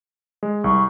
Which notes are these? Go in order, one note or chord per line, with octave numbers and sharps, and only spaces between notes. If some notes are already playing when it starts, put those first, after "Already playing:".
G#3
C2 C#6